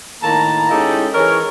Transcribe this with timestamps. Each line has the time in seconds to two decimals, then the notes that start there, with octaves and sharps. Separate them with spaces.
0.22 A2 D#3 A#3 A5 A#5
0.70 G#3 C#4 D#4 E4 G4 A4
1.15 E3 G#4 A#4 C#5